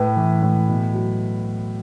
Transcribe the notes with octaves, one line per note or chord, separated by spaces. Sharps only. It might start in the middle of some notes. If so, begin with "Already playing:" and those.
Already playing: A2 B4
E3
A2
B2
F#3